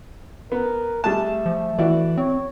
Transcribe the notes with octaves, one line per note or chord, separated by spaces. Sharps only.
B3 A#4
G3 A3 G#4 A5
F3
E3 E4 F#4 D5
C4 C#5